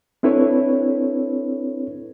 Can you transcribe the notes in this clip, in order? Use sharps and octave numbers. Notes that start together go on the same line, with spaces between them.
C4 D4 E4 A4 B4 C#5